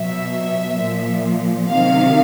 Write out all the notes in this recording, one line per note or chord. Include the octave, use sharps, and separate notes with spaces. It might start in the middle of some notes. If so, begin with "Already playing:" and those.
Already playing: B2 F#3 E5
A#2 F3
C3 D#3 F#3 F5